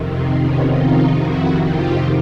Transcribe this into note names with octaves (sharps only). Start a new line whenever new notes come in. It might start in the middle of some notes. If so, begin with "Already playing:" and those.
Already playing: F2 C3 D#3
C4
B3 C#4
D#4 F4
E4 F#4
F4 G4